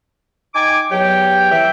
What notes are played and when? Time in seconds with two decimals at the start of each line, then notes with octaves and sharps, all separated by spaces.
0.55 D#4 G5 G#5 D6
0.91 E2 F#3 G4 C#5 G5
1.51 E3 E5 G5